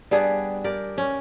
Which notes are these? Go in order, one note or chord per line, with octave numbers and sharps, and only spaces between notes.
G3 B3 D4 G#4
G4 A#4 D5
C#4